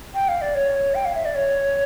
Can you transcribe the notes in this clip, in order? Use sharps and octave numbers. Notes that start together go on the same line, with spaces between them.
G5
F5
D5
C#5
G5
F5
E5
D5
C#5